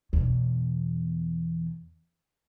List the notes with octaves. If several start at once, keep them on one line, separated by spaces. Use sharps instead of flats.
E2 B2